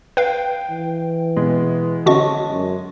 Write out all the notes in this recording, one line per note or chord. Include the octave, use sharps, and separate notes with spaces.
B4 F5 G5
E3
B2 G#3 B3
D3 C#4 F#4 D#5 A5 C#6
F#2